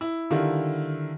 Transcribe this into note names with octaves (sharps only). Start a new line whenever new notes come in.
E4
D3 D#3 G3 E4 F4